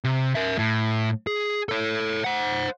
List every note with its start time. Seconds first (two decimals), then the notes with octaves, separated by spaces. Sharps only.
0.04 C3
0.35 A#4 E5
0.58 A2
1.27 G#4
1.69 A4 C#5
2.24 C5 F#5